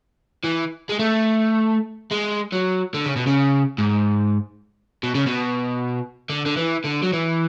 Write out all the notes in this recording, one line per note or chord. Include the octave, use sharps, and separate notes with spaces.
E3
G#3
A3
G#3
F#3
D3
C#3
B2
C#3
G#2
B2
C#3
B2
D3
D3
E3
D3
F#3
E3